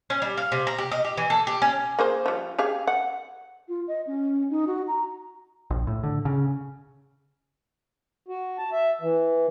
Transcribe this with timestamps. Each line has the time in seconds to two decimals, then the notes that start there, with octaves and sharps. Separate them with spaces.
0.10 C#4
0.22 G3
0.37 F5
0.52 C3
0.67 A#5
0.78 G4
0.92 D#5
1.05 G4
1.17 E3
1.30 A4
1.47 G4
1.62 C#4
1.99 A#3 G#4 C5
2.26 F3 G3
2.59 G4 G#4 F5
2.87 F#5
3.68 F4
3.88 D#5
4.07 C#4
4.50 D#4
4.67 F#4
4.88 A#5
5.70 A#1
5.87 A2
6.03 D3
6.25 C#3
8.28 F#4
8.58 A5
8.72 E5
9.01 E3